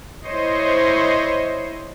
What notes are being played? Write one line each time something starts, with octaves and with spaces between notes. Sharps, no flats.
E4 C5 C#5 D#5